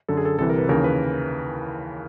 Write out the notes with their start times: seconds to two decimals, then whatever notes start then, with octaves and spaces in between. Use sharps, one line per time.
0.09 F#2 D3 A4
0.17 G#4
0.25 A4
0.38 C2 C3 E3 A4
0.50 A#4
0.59 B4
0.69 D#2 C#3 E3 A#4
0.84 B4